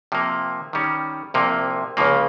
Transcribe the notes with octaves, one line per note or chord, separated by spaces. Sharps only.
C3 F3 A#3
D#3 G3 C#4
C2 C3 F3 A#3
C#2 C#3 F3 A#3